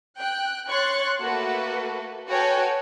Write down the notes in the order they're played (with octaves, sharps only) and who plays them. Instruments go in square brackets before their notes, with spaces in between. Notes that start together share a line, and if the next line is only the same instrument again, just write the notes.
[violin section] G5 F#6
C#5 C6 C#6 F#6 A6
A3 A#3 F#4 A4 B4
F#4 A4 B4 C#5 G5 G#5